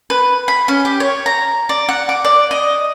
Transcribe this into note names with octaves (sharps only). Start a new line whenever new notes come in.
B4
B5
C#4
G4
C#5
A#5
D5
F#5
D6
D5
D#5